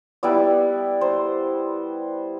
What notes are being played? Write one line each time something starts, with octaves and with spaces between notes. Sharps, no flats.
G3 B3 E4 D5
C5